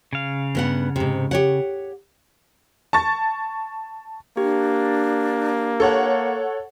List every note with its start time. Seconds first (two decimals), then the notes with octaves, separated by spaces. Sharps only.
0.13 C#3 F5
0.55 G2 B3 F#5
0.96 G#2 C3
1.31 G4 C#5 F#5
2.93 A5 C#6 A6
4.37 A#3 D4 G4
5.80 A4 C#5 F#5